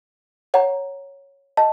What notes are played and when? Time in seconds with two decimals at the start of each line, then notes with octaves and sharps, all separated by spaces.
0.54 C#5 F#5 A#5
1.57 D#5 A5